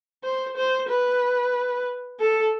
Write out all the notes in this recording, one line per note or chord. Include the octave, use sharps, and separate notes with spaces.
C5
C5
B4
A4